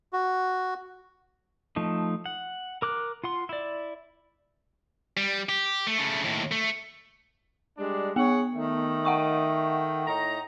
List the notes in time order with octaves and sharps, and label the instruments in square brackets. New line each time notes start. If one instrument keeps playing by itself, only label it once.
[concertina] F#4
[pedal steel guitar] F3 A3 D#4
F#5
A#4 D6 F#6
F4 F#5 C6
E4 D5
[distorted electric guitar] G3
G4
A3
C#3 A3
D#2 A2
A3
[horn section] G3 G#3 D4
[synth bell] B3 [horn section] G#4 C#5 F#5
[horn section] D#3 A3
[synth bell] F#5 G5 C#6
[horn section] A2 D#4 A#5